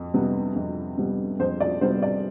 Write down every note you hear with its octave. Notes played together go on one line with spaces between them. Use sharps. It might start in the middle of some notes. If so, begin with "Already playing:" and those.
Already playing: F2
C3 G3 B3
F2
C3 G3 B3
F2 C5
D5
C3 G3 B3 C5
D5